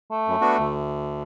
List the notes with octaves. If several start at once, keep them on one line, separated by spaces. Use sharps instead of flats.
A3
F#2
B3 D4 F#4
D2